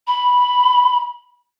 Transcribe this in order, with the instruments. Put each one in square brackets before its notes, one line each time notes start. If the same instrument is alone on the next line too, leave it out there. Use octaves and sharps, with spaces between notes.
[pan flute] B5